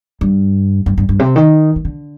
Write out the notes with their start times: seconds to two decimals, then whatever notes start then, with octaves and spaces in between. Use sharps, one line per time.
0.21 G2
0.86 G2
0.98 G2
1.09 G2
1.19 C3
1.36 D#3
1.76 D#3
1.85 D3